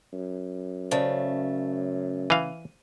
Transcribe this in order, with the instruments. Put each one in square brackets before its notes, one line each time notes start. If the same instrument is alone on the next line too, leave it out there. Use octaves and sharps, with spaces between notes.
[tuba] F#2
[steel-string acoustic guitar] C#3 A3 [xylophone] C5 D5 A5
[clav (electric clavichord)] E3 F5 [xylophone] D#7